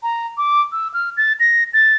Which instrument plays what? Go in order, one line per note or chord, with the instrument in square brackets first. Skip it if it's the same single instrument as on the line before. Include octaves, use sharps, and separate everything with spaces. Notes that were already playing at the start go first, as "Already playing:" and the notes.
[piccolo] A#5
D6
E6
F6
A6
A#6
A6